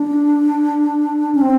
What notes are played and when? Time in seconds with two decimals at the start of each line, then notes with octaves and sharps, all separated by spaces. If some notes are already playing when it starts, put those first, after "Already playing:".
Already playing: D4
1.35 C#4
1.41 C4